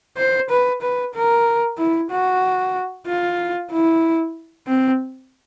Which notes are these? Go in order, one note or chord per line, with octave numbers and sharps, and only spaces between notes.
C5
B4
B4
A#4
E4
F#4
F4
E4
C4